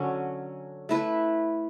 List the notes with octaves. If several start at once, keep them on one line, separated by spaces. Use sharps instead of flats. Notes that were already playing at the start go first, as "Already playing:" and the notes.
Already playing: D3 F#3 C#4
A3 E4 B4